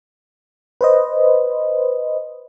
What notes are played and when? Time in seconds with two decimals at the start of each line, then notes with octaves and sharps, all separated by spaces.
0.81 B4 C5 D#5